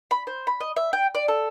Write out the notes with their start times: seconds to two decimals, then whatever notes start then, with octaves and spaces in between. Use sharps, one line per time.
0.11 B5
0.27 C5
0.47 B5
0.61 D#5
0.76 E5
0.93 G5
1.15 D5
1.28 A4